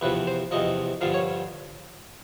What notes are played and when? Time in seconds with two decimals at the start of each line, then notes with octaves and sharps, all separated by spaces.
0.01 E2 C3 F3 B4
0.27 C5
0.51 E2 C3 F3 D#5
1.01 G2 D3 F3 F5
1.14 C#5